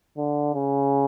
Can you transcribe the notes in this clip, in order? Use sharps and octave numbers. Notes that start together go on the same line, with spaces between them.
D3
C#3